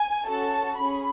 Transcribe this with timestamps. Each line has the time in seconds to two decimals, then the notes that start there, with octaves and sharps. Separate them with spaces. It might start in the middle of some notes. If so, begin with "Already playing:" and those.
Already playing: G#5
0.24 C#4 F#4 A4 A5
0.76 C#4 G#4 B5